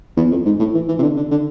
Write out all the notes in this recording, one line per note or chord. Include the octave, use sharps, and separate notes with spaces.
E2
F2
G#2
A2
E3
E3
C3
D3
D3
D3